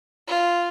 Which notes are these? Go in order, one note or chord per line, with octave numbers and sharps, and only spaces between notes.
F4